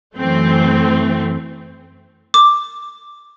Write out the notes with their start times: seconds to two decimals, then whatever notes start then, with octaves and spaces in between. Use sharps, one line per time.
0.17 F#2 E3 A3 C4
2.34 D6